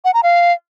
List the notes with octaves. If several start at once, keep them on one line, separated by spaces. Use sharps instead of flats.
F#5
A#5
F5